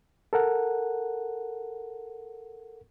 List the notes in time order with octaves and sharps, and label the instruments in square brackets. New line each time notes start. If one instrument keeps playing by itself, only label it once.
[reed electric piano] A4 A#4 F#5